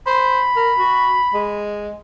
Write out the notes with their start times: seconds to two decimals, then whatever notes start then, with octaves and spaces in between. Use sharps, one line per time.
0.07 C5 B5
0.56 A#4
0.78 F#4
1.34 G#3